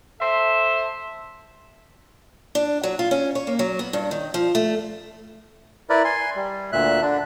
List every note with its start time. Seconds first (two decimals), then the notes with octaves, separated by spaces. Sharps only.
0.21 A4 C5 E5
2.55 D4
2.83 F#3
2.99 F4
3.11 C#4
3.35 C#5
3.47 A#3
3.59 F#3
3.79 B3
3.93 G2
4.11 D#3
4.34 F3
4.55 A3
5.90 E4 A#4 B4 D5
6.05 G#5 C6
6.36 G3
6.72 D2 A#2 E5 F#6
7.02 D3 D4